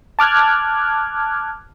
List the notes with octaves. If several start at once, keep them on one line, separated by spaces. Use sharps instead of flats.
A5 D6 F6 F#6 G#6